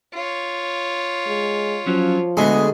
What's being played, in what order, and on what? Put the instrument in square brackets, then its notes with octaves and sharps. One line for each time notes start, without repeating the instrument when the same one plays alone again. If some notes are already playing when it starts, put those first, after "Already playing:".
[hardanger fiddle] F4 C#5
[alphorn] G#3
[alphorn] F3 [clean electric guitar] F#3 C#4
[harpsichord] D2 G#3 [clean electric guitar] B3 G#4 A4